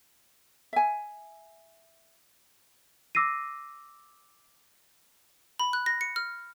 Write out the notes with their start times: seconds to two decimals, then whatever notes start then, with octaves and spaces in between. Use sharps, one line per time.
0.73 E5 G#5
3.15 D6 E6 A#6 C7 D#7
5.59 B5
5.73 F#6
5.86 A#6
6.01 C#7
6.16 F6